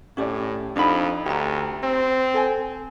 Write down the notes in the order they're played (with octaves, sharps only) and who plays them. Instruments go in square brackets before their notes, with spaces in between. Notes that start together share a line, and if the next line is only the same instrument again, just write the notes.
[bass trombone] A2 [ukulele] C#4 G4 D5
[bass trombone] F2 [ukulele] D4 D#4 B5
[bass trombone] D2 [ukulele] G4 A#5
[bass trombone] C4
[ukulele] A4 G#5